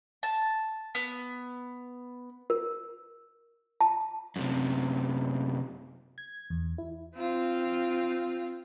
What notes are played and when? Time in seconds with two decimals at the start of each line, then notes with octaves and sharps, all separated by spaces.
0.23 A5
0.95 B3
2.50 A#4
3.81 A5
4.36 F#2 C3
6.18 G#6
6.50 E2
6.78 E4
7.16 C4 F4